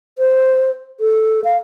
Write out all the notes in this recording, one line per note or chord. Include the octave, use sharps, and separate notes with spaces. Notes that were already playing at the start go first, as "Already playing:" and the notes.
C5
A4
F5